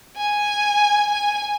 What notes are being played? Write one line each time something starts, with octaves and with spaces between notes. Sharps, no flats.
G#5
G#5